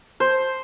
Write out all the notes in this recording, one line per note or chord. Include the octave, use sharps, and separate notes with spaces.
C5